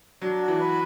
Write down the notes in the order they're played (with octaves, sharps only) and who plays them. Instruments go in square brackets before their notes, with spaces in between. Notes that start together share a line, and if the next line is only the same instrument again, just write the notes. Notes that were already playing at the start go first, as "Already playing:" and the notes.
[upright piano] F#3 [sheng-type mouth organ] D4
[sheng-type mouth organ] F#4
[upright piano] E3
[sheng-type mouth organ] B4